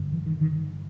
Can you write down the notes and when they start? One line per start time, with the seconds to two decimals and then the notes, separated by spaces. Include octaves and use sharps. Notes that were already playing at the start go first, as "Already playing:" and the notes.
Already playing: G2 D3
0.12 E3
0.26 D#3
0.41 D#3